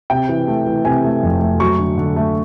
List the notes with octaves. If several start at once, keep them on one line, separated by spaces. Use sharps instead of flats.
C3 G5
E3
A3
E3
C3 G#5
A3
F2
A3
F#3 C#6
D3
D3
A3